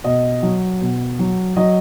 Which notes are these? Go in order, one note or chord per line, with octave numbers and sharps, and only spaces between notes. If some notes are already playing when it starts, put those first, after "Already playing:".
B2 D#5
F#3
B2
F#3
F#3 D#5